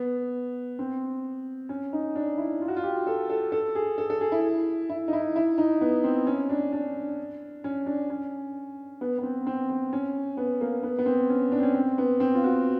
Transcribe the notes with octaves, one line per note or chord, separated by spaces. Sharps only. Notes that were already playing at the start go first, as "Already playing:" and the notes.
Already playing: B3
C4
C#4
D#4
D4
E4
F4
F#4
F4
G4
A4
A4
A4
G#4
A4
A4
G#4
E4
E4
D#4
E4
E4
D#4
B3
C4
C#4
D4
D4
C#4
D4
C#4
B3
B3
C4
C4
C4
C#4
B3
A#3
B3
B3
C4
C#4
D4
C4
C#4
C4
B3
C4
F4
F#4